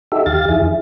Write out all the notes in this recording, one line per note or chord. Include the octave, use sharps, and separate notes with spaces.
D#4 F#4 G4 A4 E5
D#2 G4 F5 A6
F2 D#3 E4 G#4
E4